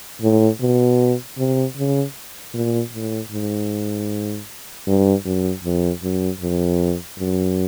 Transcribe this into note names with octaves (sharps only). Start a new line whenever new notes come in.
A2
B2
C3
C#3
A#2
A2
G#2
G2
F#2
F2
F#2
F2
F#2